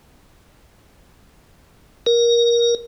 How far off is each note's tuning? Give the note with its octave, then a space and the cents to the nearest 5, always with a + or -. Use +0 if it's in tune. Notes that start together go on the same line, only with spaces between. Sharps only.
A#4 +15